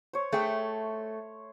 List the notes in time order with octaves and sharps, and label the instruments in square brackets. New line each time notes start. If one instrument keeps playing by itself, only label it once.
[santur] C5 C#5
[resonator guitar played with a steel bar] A3 [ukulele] G#4 G5